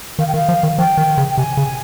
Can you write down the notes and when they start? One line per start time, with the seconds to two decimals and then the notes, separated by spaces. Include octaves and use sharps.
0.19 D#3 F5
0.27 G5
0.33 D#3 F5
0.49 F3
0.63 D#3
0.78 F3 G5
0.97 D#3
1.18 C#3
1.29 G5
1.37 C3 G#5
1.57 C#3